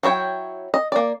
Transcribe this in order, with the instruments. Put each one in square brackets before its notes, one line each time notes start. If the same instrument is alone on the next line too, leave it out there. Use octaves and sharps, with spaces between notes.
[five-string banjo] F#3 E4 C#5 G5
D#5
A#3 D5